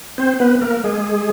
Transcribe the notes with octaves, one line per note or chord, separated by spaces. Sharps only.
C4 C5
B3 B4
A#3 A#4
G#3 G#4